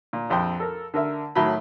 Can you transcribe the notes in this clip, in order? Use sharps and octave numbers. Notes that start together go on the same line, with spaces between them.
A#2
A#1 F2 C5 G5
A4 A#4
D3 A#4 E5
A2 D#3 F#3 B5